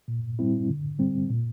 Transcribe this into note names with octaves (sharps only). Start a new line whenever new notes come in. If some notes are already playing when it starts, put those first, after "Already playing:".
A#2
G3 C4 E4
D3
G3 C4
A#2